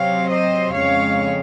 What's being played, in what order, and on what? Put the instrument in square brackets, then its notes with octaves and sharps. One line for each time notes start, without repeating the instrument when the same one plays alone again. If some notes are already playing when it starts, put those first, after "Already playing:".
Already playing: [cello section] C3 F#3 C4 C#5 F5
C5 D#5
F2 C#3 G#3 C#5 F5